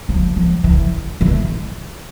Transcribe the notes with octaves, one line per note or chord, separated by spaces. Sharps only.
F3
F3
E3
E3